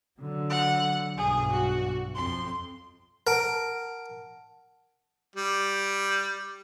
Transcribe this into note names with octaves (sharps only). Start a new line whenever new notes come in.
D3 F#3
F#5
B1 G2 G#4
F#4
F2 C6
A#4 F#5 A5 D7
G3